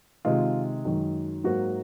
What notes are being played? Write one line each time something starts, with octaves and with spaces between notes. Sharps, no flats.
C3 D#3 G#3 F4
F#2 D#3 G#3
G#2 F#3 A#3 F#4